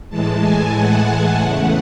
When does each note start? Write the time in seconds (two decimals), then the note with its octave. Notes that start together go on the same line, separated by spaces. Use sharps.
0.09 A2 E3 G#3 A5
0.41 G#5
0.74 F#5
1.39 E2 C#3 E3 A3